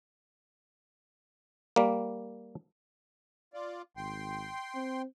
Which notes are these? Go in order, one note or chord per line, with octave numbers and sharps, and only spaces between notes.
G3 A#3
F4 D5
G#1 G5 C6
C4